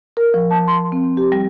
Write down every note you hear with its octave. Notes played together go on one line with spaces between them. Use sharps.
A#4
F3
A5
C6
C4
G4
G3